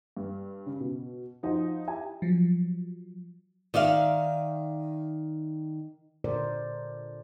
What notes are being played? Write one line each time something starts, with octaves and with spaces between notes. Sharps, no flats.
G2
C#3
B2
F3 D#4 F#4 C5 D#5
E4 G4 G#5
F3 F#3
D#3 D5 E5 F5
A#2 D3 A#4 C5 D5